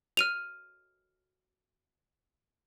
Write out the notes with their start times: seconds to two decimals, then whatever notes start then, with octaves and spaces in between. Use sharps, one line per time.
0.17 F6 D#7 F7